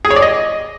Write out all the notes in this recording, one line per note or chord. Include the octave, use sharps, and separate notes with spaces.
G#4
C#5
D5
D#5